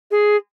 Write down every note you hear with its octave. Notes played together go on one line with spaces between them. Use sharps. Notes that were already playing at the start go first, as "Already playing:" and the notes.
G#4